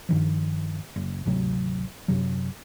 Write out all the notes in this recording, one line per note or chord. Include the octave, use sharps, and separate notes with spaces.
G2 D#3 F3
F#1
G#1 D2 C3 F#3
F#2 C3 F#3